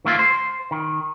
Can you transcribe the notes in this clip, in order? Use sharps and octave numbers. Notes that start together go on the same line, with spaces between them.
D#3 A3 A#3 F4
C5
D#3